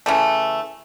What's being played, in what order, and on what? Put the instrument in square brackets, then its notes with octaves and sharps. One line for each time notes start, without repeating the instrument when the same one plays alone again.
[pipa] C#3 E3 A3